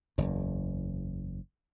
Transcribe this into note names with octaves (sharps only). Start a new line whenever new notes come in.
F#1 E2